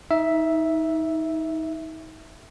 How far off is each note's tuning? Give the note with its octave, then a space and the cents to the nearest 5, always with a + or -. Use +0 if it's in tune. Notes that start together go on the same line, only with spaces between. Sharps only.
D#4 +30 E5 +0